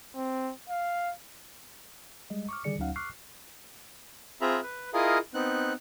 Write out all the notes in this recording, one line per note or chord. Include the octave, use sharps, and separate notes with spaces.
C4
F5
G3 G#3 D#5
C#6 D6 F6
D3 D#3 G3 G#4 D5 C#7
D2 F#3 C#4 D#4 F5 F#5
C#6 D6 F6 F#6 C7
C4 F4 G#4 E5 A#5 B5
B4
E4 F4 G#4 A#4 D#5 F5
B3 C4 D#4 F#6